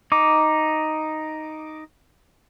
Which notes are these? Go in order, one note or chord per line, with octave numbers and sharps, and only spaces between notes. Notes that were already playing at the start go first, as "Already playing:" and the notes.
D#4 D6